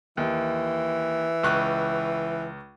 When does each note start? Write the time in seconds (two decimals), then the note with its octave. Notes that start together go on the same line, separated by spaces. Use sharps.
0.17 D#2 E3
1.43 C#2 C#6 F#6